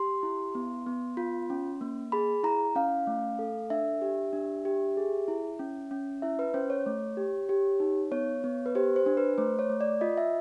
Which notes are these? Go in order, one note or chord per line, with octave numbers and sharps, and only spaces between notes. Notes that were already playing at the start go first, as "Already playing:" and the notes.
Already playing: G4 C6
E4
B3
B3
F4
C#4
A#3
G#4 B5
E4 A#5
C#4 F5
A3
A4
D4 E5
G4
D4
G4
G#4
E4
C#4
C#4
E4 E5
B4
C#4 C5
C#5
A3
G4
G4
D#4
B3 C#5
B3
B4
G4 C5
C5
D4
B4
A3 C5
C#5
A3
D5
F4 D#5
E5